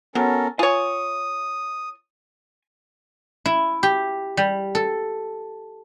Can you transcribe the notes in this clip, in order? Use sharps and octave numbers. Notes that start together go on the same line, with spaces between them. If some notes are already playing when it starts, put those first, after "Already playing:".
F#3 B3 C#4 A4 A#4
F4 C#5 G#5 D#6
E4
G4
G3
A4